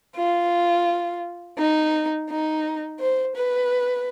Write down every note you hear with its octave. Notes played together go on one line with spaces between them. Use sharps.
F4
D#4
D#4
C5
B4